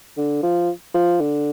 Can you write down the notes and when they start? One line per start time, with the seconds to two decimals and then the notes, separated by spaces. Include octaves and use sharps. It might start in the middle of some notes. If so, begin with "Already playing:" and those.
0.17 D3
0.43 F3
0.94 F3
1.20 D3